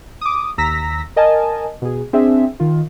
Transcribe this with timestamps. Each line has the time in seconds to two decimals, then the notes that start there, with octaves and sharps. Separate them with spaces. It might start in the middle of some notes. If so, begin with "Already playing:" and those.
0.21 D6 D#6
0.58 D#2 A#5 E6 A#6 B6
1.16 A#4 D#5 G#5 A5
1.82 B2 G#4
2.13 C4 D4 G#4 E5
2.60 D#3 F4